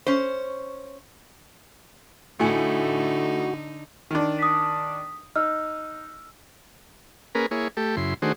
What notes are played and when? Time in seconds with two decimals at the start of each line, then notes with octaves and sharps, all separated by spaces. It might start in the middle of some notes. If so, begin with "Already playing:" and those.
0.06 C#4 C5
2.40 A2 D3 A3 D#4 F#4 G#5 C#7
4.11 D#3 D4
4.39 D#6 B6
5.36 D#4 E6 F6
7.35 A#3 C#4 G#4 A#4 B4
7.51 A#3 E4 G#4 C#5
7.77 A3 G4 A4
7.97 F#2 C#3 E4 C6
8.22 D#3 A3 D4 F#4 G#4 C5